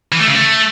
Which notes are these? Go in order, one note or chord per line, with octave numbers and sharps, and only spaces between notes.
E3
A3
C#3
A3